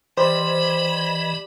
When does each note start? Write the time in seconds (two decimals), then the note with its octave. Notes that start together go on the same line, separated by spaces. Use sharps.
0.17 E3 G3 C5 D#5 B5